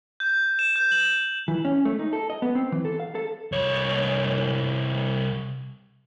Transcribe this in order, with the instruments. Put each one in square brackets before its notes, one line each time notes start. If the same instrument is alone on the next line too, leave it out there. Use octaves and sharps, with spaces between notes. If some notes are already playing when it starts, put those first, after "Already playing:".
[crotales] G6
E7
G6
F#7
[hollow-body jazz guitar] E3
C#4
A3
D#4
A4
D#5
B3
C4
E3
A4
F5
A4
[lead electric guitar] C2 C#5